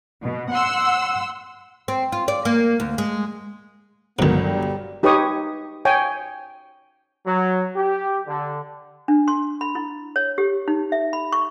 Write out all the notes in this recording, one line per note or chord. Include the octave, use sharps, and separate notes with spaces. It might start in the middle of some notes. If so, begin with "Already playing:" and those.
B2
F#5 C6 E6
C4
F4
D5
A#3
D2
G#3
G1 G#2 D#3 F#3 B3 A#4
G3
D#4 G4 B4 C#5 C#6 D#6
C#5 G5 G#5
F#3
G4
D3
D4
C6
B5
E4
C#5
G4
D#4
E5
B5
C#6